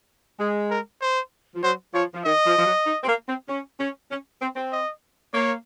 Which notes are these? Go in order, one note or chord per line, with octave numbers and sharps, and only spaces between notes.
G#3 G#4
A#4
C5
F3
F#3 C5
F3 C#5
F3
D#3 D#5
F3
F3
F#3
D#4
C4
A#3
C4
C#4
C#4
C#4
C4
C4
D#5
A#3 C#5